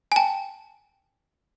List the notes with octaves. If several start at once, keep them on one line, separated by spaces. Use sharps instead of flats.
G#5
G5 A5